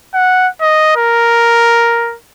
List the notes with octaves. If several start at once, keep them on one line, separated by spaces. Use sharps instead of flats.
F#5
D#5
A#4